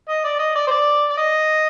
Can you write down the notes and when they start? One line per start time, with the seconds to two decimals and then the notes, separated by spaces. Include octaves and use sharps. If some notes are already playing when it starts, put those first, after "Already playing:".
0.09 D#5
0.24 D5
0.40 D#5
0.56 D5
0.67 C5
0.71 D5
1.11 D5
1.18 D#5